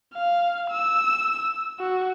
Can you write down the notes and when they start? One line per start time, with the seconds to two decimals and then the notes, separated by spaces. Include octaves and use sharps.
0.14 F5
0.70 E6
1.79 F#4